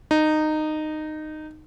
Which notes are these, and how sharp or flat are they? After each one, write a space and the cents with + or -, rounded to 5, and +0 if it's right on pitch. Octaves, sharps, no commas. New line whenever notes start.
D#4 -15